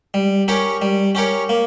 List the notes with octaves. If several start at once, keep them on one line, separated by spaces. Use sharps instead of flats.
G3
C#4 G4 A#4 C#5
G3
C#4 G4 A#4 C#5
A#3